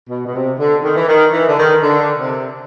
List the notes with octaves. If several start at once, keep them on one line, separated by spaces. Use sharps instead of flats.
B2
B2
C3
D3
D#3
E3
D#3
E3
D3
D#3
D3
C3